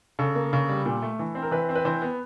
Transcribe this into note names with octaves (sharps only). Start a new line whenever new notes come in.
C#3 A4
A#3
C#3
G3
A#2
A3
E3
C4
A#4
E3 B4
C4
B4
E3 C5
B3